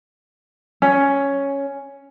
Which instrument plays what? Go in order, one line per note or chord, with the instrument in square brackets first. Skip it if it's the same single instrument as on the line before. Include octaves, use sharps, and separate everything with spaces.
[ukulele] C#4